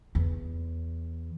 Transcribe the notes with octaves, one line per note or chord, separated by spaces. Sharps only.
E2